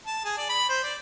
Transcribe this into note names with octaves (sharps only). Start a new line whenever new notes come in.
A5
G#4
D5
B5
C5
D5